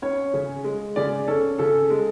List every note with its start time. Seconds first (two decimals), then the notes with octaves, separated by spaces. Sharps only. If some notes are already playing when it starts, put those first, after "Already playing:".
0.02 C#4 C#5
0.34 C#3
0.64 G#3
0.96 C#3 D5
1.28 C#4 A4
1.59 C#3 A4
1.90 G#3